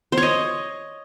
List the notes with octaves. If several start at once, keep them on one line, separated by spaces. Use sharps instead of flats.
C5
C#5
D#5